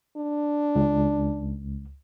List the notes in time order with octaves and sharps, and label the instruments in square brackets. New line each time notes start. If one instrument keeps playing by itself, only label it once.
[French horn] D4
[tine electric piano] C#2